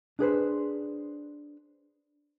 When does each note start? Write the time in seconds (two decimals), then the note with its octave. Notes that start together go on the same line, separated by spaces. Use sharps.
0.19 D4 G#4 B4 C5